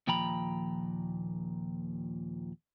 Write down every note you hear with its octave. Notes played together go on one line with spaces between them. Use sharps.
D#2 A#2 F3 G5 A#5 B5